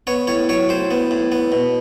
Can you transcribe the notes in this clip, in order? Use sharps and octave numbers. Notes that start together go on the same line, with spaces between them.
B3 C#5
A2 C#5
F#3 C#5
A2 C5
B3
A2
B3
B2